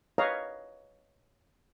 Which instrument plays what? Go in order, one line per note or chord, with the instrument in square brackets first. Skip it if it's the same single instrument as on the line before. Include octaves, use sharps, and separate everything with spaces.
[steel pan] B4 C#5 D#5 F5 A#5